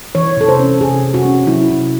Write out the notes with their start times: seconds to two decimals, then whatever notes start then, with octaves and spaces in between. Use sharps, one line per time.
0.15 E3 C#5
0.37 C3 A4
0.49 C5
0.59 C#4
0.81 C3 G#4
1.04 C3
1.14 F#4
1.25 C#4
1.47 F#3 E4
1.70 C3